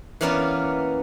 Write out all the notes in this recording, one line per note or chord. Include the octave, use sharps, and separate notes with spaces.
E3 A#3 B3 C#4 A#4 D5